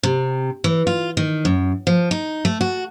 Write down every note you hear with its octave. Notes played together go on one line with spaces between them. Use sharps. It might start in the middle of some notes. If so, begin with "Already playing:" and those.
C3
E3
F4
D#3
F#2
F3
D#4
A3
F#4